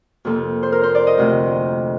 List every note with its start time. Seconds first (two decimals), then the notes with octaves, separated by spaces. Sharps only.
0.25 F2 C3 F3 A#3 A4
0.63 C5
0.72 A#4
0.83 C5
0.95 D5
1.07 D#5
1.18 D2 C3 F3 A3